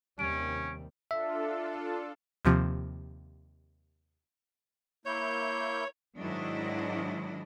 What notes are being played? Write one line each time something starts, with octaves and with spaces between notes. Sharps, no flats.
D#2 C3 G3 C#4 D7
D4 F4 A4 E5
D#2 C3 F3
A#3 E4 C#5 G6
G#2 D#3 F#3 D4 E4 D#5